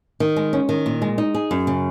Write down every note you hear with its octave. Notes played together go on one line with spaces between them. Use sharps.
D#3
G#3
C#4
D#3
A#2
G#3
D#4
G#4
F#2
C#3